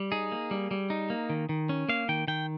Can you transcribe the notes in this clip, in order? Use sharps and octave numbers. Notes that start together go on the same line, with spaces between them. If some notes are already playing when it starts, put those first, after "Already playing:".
Already playing: G3
D#4 G#4
A#3
G3
G3
D#4
A#3
D#3
D#3
C#4
A#3 F5
D#3 G5
D#3 G5